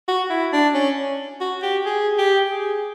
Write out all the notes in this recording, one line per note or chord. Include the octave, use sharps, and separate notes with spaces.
F#4
E4
D4
C#4
F#4
G4
G#4
G4
G#4